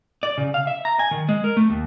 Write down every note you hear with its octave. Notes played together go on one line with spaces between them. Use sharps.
D5
C#3
F5
E5
A#5
G#5
D#3
G#3
A#4
A3
D#2